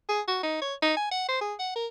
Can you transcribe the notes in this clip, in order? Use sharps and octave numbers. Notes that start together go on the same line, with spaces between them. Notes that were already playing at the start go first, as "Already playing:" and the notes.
G#4
F#4
D#4
C#5
D#4
G#5
F#5
C5
G#4
F#5
A#4